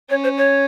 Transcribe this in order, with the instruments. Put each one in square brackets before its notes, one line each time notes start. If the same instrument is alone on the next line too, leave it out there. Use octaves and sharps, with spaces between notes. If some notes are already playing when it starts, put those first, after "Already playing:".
[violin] C#4 [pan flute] C#5
[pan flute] C5
C#5